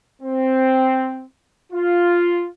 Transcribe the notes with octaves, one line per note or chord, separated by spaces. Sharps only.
C4
F4